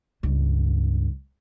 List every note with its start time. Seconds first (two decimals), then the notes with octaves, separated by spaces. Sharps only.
0.23 C#2 G2